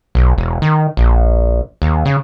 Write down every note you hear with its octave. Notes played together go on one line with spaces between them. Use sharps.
B1
E1
D#3
A#1
D#2
C#3